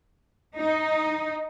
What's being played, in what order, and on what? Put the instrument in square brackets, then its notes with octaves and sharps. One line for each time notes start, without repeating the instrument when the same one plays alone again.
[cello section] D#4